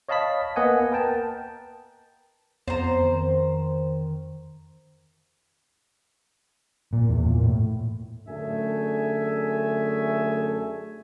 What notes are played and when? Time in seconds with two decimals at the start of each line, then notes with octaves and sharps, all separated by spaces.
0.09 C#5 D#5 F5 A5 B5 B6
0.56 A#3 B3 D#5 F#5 G#5
0.92 A#4 B4 G5 A5
2.68 F2 B3 C5 A#5
3.03 D#3
6.93 A#2
7.09 E2
7.26 A#2
7.43 A2
8.28 F#2 D3 A3 G#4 E5 G#5